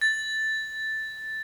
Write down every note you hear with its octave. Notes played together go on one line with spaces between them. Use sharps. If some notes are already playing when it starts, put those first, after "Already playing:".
A6